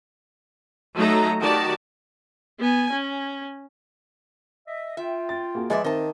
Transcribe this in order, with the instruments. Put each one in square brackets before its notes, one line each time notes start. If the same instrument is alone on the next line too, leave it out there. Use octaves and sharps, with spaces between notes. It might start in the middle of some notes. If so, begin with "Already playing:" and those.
[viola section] F#3 A3 D#4 A4 A#5
D#3 F#4 G4 D5 A5
[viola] B3 G#5
C#4
[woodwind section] D#5 E5
[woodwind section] F4 G5 [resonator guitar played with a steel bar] E5
[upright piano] A6
A#3 F#4 G#4
[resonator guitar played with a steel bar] F3 D5 E5 [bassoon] G#3 [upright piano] B4 D6
[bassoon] D#3 [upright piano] C4 [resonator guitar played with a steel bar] D#5 A5